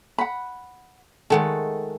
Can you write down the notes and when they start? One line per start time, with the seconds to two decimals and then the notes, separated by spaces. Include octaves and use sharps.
0.18 F#5 B5
1.30 D#3 G#3 A3 A4 F#5